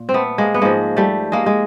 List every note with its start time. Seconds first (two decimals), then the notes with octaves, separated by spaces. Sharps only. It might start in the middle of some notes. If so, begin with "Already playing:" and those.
Already playing: A#2
0.09 C4
0.14 A3 B3
0.38 G#3 A#3
0.54 B3
0.62 G#2 F3 G#3 A#3
0.97 G3 A3
1.32 G#3 A#3
1.46 G#3